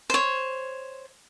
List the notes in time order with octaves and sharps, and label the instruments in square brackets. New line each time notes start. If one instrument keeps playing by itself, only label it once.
[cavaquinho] C5 C#5